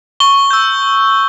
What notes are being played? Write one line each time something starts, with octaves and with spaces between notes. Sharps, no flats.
C#6 G7
E6 G6